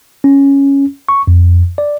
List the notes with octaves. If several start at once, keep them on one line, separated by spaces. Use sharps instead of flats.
C#4
C#6
F2
D5